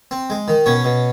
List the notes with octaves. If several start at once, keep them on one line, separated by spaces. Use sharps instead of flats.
C4
G#3
D#3
B2 C#4 C#5
B2